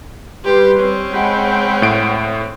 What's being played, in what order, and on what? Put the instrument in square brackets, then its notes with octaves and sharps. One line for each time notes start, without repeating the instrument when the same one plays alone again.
[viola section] G3 C6 [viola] G4 [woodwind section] B4
[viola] C4 C#4
[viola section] G#3 G5 B5 [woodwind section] F#5
[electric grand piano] A2 D7